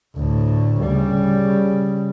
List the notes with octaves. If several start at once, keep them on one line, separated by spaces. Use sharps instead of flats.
D2 A2
C#3 G3